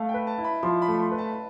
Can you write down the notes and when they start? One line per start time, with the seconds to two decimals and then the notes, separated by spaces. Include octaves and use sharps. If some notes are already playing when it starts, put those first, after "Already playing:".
Already playing: A3 F5
0.09 G5
0.14 B4
0.27 A5
0.38 E4
0.44 B5
0.63 F3 C6
0.82 B5
0.88 A3
0.99 C6
1.12 B4
1.18 A5